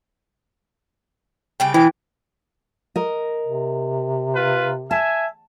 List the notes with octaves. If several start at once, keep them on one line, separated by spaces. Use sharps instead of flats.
C#3 G3 G5
E3 G5
A#4 D#5
C3
F4 B4
E5 G#5 A5